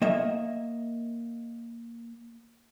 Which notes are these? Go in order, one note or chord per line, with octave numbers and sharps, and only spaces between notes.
A#3 D#5 E5